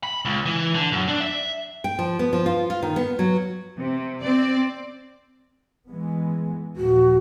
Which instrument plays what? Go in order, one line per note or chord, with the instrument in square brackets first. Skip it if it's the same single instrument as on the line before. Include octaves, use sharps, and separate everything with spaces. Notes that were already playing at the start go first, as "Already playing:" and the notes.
[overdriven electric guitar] B5
C#2
E3
D3
F#2
D4
E5
[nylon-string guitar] G5
F3
B3
F3
F4
F4
D#3
B3
F#3
[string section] C3
C4 D5
[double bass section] E3 G#3 B3
[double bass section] D#2 A#2 F3 [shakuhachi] F#4